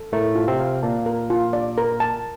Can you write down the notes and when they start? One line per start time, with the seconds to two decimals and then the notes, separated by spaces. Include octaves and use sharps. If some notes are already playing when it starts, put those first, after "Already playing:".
Already playing: A4
0.12 A2 A3 A#4
0.35 F4
0.47 C3 C4
0.60 F5
0.83 A#2 A#3 A5
1.06 A#4
1.30 F4
1.53 D5
1.78 A#4
2.00 A5